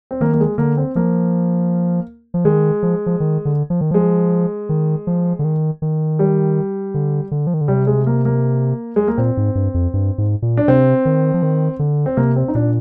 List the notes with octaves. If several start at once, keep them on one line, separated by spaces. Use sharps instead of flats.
C4
D#3 A#3
A#3
G#3
D3 A#3
C4
F3 A#3
F3
D#3 G#3
F3
F3
D#3
D3
F3
D#3
F3 G#3
D#3
F3
D3
D#3
D#3
G3
D3
D3
F3
D#3
D3
C3 G3
G#3
A#3
A#3
G#3
A#3
A#2 C4
G#2
G2
F2
G2
G#2
A#2
D4
C3 C4
D#3
F3
D#3
D3
C4
C3 A#3
C4
D#4
A#2 D4